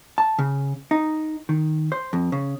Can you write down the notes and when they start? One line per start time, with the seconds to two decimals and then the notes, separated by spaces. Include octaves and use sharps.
0.18 A5
0.39 C#3
0.91 D#4
1.49 D#3
1.92 C5
2.13 F2
2.32 C#3